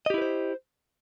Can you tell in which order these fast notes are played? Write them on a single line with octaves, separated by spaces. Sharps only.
D#5 G4 E4 B4 C5